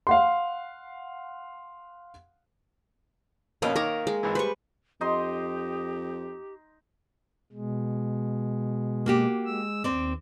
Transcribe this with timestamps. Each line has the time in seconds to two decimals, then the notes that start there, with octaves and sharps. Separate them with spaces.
0.07 F5 F#5 C6
3.62 F2 B2 A#3 C#4 D#5 F5
3.76 D#3 A#4 C#5 A#5 D6
4.07 G#3
4.23 G#1 E3
4.35 G3 B4 C5 C#6
5.01 F2 D#4 G4 D#5 C6
7.53 B2 G#3
9.06 A#3 F#4 G4
9.45 G#3 E6
9.84 D#2 C4 D5